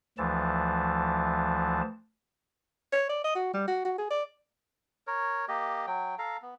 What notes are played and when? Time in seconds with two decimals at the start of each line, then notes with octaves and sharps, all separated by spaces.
0.18 D2 E3 F3 A5
2.93 C#5
3.09 D5
3.24 D#5
3.35 F#4
3.54 G3
3.67 F#4
3.85 F#4
3.98 G#4
4.11 D5
5.07 A#4 C#5
5.48 A#3 G4 D#5
5.87 F#3 G5
6.19 A4 F5 A#5
6.42 B3